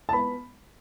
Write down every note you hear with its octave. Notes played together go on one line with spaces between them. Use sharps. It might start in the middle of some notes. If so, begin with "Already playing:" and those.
A5
B3 B5